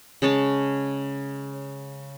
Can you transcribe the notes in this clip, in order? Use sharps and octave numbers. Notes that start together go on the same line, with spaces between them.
C#3 G#3 C#5 A5